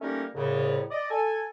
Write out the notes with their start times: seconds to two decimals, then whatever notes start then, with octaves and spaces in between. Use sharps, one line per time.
0.02 G3 A3 A#3 C#4 D#4 A#4
0.35 C2 A2 C#3
0.91 D5 D#5
1.11 A4 G#5